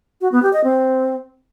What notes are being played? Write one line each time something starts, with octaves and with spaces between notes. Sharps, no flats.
F#4
B3
G4
D#5
C4